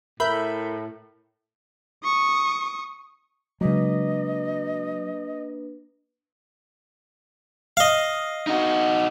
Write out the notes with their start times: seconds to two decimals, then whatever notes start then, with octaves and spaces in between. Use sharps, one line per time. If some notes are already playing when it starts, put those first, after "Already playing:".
0.20 A2 A#4 E5 B5 G6
2.04 C#6 D#6
3.61 C#3 F#3 G#3 A#3 D4 B4 D#5
7.77 D#5 F5
8.47 D#4 F#4